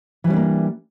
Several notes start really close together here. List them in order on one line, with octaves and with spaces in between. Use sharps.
E3 G3 C#4 D4 A#3